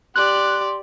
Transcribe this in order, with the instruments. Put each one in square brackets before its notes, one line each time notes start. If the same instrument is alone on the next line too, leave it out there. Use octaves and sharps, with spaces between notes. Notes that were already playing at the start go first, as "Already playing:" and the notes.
[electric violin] G4 D5 [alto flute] C6 [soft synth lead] F#6